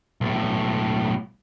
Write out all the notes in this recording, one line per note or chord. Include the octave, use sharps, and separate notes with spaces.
B1 A2